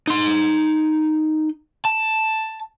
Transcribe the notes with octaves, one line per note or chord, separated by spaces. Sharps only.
D#4 C6
A5